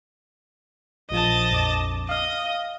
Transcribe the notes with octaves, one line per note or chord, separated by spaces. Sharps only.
A#1 A#2 F3 D#5 A5
A#1 F2 D6
D#5 F5 F6